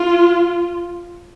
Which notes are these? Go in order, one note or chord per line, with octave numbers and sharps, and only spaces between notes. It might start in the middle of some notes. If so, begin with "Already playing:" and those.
Already playing: F4